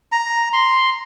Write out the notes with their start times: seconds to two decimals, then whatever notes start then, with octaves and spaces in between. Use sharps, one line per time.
0.12 A#5
0.53 C6